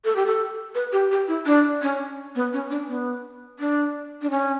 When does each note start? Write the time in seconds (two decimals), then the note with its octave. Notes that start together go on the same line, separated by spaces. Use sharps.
0.05 A4
0.16 G4
0.27 A4
0.75 B4
0.92 G4
1.11 G4
1.28 E4
1.46 D4
1.82 C#4
2.35 B3
2.53 C#4
2.70 D4
2.87 B3
3.59 D4
4.22 D4
4.30 C#4